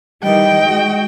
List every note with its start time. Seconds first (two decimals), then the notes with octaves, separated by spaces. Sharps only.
0.23 D#3 E3 G3 D#5 G5
0.61 G#3 F#4